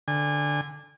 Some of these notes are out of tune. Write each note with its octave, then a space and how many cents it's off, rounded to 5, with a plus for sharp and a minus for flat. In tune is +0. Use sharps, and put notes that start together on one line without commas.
D3 +0 G#5 -25